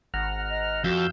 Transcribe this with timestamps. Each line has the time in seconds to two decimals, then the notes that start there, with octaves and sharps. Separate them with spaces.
0.14 G#1 F#5 A#5 F6
0.50 D#5
0.84 F2 F#4 F5 E6 G6